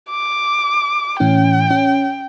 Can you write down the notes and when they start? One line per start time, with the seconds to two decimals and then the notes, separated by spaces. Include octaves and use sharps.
0.11 D6
1.20 A2 E3 C#4 G5
1.71 C#4